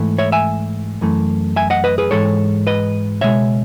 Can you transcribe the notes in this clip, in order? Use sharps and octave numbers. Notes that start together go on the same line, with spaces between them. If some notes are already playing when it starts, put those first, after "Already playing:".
Already playing: G#2 E3 A3
C#5 E5
E5 G#5
F#2 E3 A3
E5 G#5
D#5 F#5
B4 D#5
G#4 B4
G#2 E3 G#3 A4 C#5
B4 D#5
C#2 B2 G#3 C#5 E5